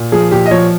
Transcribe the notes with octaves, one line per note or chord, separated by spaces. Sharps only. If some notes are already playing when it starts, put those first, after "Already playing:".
Already playing: A#2
F3 G#4
A#2 G4
D#5
F3 C#5